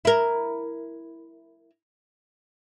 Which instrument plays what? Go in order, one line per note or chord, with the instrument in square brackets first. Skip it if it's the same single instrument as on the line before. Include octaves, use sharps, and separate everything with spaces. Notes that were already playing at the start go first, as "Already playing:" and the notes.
[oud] E4 A#4